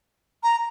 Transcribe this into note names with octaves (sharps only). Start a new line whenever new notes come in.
A#5